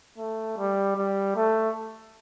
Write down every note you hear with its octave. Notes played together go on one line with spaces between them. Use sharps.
A3
G3
G3
A3